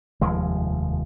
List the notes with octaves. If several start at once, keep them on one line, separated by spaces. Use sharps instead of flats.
F1 D#2 F3 G#3